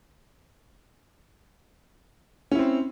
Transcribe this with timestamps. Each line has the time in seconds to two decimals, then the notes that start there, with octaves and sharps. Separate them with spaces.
2.52 C#4
2.55 E4
2.59 C4